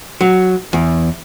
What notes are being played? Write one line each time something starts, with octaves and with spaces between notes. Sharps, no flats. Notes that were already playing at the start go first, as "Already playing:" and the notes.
F#3
E2